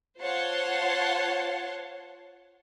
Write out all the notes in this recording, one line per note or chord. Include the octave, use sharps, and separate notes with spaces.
F4 C5 C#5 F#5 A5 C6